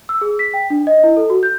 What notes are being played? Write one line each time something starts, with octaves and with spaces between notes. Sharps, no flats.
E6
G#4
B6
G5
D4
D#5
E4
A4
F#4
G6